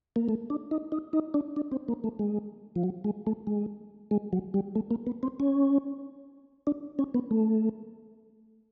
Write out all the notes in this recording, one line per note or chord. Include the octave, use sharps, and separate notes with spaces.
A#3
A3
D4
D#4
D#4
D#4
D4
D4
C4
A#3
A3
G#3
F3
F#3
G#3
A3
G#3
G#3
F#3
G3
A3
A#3
B3
C4
C#4
D4
C#4
B3
A3